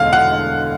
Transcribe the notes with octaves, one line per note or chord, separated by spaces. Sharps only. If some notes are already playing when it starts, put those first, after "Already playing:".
Already playing: E1 D2 D3 F5
F#5